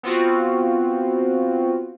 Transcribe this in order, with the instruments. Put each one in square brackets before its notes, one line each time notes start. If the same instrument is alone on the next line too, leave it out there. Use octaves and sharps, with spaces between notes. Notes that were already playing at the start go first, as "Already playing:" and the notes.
[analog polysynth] B3 C4 F4 F#4